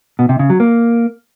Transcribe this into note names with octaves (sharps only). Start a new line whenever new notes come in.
B2
C3
C#3
F#3
A#3